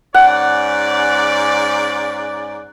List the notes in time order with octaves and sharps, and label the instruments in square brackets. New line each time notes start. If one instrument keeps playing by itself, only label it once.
[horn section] G#2 C#4 D5 [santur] F#5